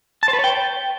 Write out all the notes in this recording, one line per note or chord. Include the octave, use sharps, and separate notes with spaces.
A5
C5
B4
C#5
G5